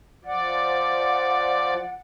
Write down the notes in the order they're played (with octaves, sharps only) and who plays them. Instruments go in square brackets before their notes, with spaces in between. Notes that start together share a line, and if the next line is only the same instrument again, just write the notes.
[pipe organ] F3 D5 [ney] F#5